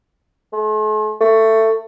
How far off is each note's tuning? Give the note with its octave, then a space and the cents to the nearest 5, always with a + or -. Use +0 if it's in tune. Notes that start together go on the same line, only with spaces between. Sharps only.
A3 -45
A3 +15